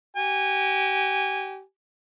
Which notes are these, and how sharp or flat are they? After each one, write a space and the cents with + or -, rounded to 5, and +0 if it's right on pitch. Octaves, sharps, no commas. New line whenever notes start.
G4 -35 G#5 -20